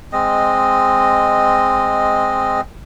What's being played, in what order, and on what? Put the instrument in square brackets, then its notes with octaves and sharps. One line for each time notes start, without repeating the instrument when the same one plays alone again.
[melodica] G#3 C4 D#5